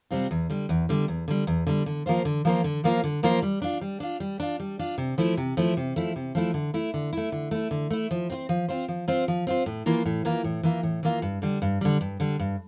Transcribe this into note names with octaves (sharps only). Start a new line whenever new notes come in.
C3 G3 C4 F4
E2
D3 G3
E2
D3 G3
E2
D3 G3
E2
D3 G3
D3
F3 A#3 F4 C5
D3
F3 A#3 F4 C5
D3
F3 A#3 F4 C5
D3
F3 A#3 F4 C5
G3
D4 F4
G3
D4 F4
G3
D4 F4
G3
D4 F4
C3
F3 A3 E4
C3
F3 A3 E4
C3
F3 A3 E4
C3
F3 A3 E4
D3
A3 E4
D3
A3 E4
D3
A3 E4
D3
A3 E4
F3
C4 F4 C5
F3
C4 F4 C5
F3
C4 F4 C5
F3
C4 F4 C5
A2
E3 A#3 F4
A2
E3 A#3 F4
A2
E3 A#3 F4
A2
E3 A#3 F4
G2
D3 G3
G2
D3 G3
G2
D3 G3
G2